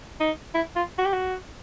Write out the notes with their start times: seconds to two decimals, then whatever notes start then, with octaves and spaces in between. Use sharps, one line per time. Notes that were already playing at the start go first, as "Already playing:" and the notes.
0.20 D#4
0.54 E4
0.76 F4
0.98 F#4
1.06 G4
1.13 F#4